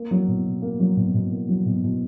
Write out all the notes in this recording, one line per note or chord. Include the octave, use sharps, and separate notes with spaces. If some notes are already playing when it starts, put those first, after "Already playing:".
Already playing: A#3
F#3
B2
B2
A#3
F#3
B2
B2
A#3
F#3
B2
B2